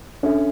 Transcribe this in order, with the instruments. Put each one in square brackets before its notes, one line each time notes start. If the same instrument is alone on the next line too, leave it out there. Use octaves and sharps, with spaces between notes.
[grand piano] C#4 [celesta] D4 A4 E5